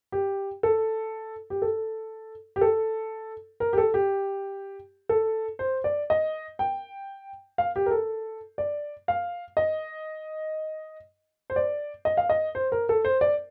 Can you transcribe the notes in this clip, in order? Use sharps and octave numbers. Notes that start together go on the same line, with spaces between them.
G4
A4
G4
A4
G4
A4
A#4
G4
A4
G4
A4
C5
D5
D#5
G5
F5
G4
A#4
A4
D5
F5
D#5
C5
D5
D#5
F5
D#5
C5
A#4
A4
C5
D5